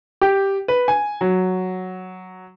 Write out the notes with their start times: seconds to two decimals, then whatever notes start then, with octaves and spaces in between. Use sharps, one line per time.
0.21 G4
0.68 B4
0.88 G#5
1.21 F#3